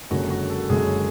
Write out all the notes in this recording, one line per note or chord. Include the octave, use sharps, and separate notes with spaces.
F#1 F#2 D3 G#3 F#4
F#4
A4
F#1 F#2 D3 G#3 G#4